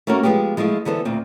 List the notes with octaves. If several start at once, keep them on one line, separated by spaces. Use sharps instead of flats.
A3 A#3 C#4 F#4 A#4
F3 G#3 B3 F4 G4
F3 G#3 A3 E4 F4
D3 E3 B3 A4 C5
D2 A#2 C4